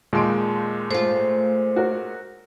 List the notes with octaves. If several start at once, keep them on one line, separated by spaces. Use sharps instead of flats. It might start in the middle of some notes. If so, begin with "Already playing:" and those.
D#2 A#2 G#3 C6 D7
A3 F4 C5
F#4 A#4